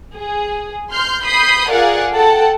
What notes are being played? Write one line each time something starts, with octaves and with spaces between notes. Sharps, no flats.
G#4
C6 F6 G6
B5 D#6 G6 C7
F4 G#4 A#4 D5 F5 F#5
A4 F#5 G5 A5